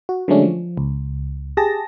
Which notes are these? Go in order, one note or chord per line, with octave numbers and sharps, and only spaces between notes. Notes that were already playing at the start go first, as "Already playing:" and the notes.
F#4
D3 F#3 G#3 A3 C#4 D4
F3
C#2
G4 G#4 A5 A#6